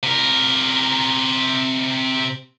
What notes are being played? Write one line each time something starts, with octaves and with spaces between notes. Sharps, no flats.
C3 A#4